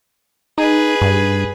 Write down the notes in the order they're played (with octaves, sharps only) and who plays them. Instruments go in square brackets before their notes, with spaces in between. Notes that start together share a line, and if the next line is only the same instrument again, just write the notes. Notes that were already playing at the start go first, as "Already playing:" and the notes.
[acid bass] D#4 [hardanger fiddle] G#4 B4
[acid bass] G2